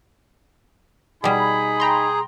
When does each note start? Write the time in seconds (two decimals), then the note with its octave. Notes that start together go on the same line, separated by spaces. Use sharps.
1.24 B2 G3 D#4 G#4 G#5 B5
1.80 G5 A#5 C6